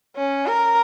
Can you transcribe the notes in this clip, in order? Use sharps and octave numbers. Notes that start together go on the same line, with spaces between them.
C#4
A#4